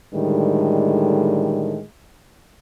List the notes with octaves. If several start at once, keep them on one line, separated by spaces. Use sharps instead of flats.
A2 D3 D#3 G3 G#3